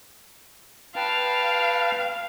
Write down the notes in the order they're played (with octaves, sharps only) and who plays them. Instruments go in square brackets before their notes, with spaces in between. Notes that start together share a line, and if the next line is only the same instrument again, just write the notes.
[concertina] B4 G5 A5 [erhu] F5